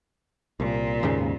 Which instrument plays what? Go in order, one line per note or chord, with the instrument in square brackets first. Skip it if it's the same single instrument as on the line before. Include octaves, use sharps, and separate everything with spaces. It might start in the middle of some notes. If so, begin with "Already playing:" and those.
[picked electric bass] C2 [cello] A#2
[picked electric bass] D#2 G#2 C#3